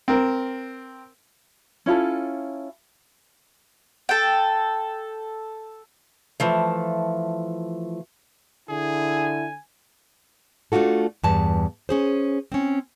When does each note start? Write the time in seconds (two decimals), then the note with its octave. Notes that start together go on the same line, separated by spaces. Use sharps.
0.08 C4 A#4
1.86 C#4 E4 F4 A4
4.09 A4 G5
6.40 E3 F3 A3
8.69 D3 E4 G#4 G#5
10.72 A3 D4 F4 F#4 A4
11.23 E2 G2 A5
11.89 C#4 G#4 C5
12.52 C4 C#4